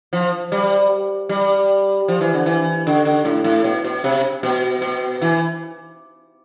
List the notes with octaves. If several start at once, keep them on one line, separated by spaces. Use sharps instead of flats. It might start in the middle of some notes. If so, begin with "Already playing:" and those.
F3
G3
G3
F3
E3
D3
E3
D3
D3
A2
A2
B2
B2
C3
B2
B2
E3